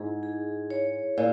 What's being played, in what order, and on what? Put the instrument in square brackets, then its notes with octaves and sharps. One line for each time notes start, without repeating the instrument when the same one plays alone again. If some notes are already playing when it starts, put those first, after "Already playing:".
Already playing: [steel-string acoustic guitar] G#2 [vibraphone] E4 G#4
[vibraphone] G#4
C#5
[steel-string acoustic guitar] A#2 [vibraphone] E4